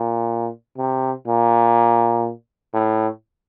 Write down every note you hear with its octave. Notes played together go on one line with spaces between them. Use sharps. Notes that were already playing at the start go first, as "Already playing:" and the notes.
Already playing: A#2
C3
A#2
A2